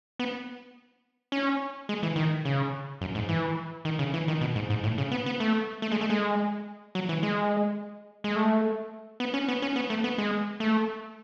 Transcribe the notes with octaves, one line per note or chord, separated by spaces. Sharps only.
B3
C#4
G#3
E3
D#3
C#3
F#2
G#2
E3
D#3
C#3
E3
D#3
B2
G#2
G#2
A2
C#3
B3
B3
A3
A3
G#3
A3
G#3
F#3
E3
G#3
G#3
A3
B3
C#4
B3
C#4
B3
A3
B3
G#3
A3